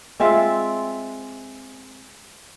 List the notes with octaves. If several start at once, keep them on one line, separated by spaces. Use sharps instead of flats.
G#3 C4 F4 E5